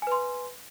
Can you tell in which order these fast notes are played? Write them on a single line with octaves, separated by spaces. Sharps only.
G#5 B4 C6